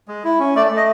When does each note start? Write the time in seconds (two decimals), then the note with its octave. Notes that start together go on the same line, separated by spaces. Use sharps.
0.08 G#3
0.24 E4
0.39 C#4
0.55 A3 D5
0.72 A3
0.77 D#5